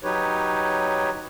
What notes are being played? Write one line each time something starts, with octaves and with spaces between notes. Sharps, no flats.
F#3 D#4 G4 B4 C#5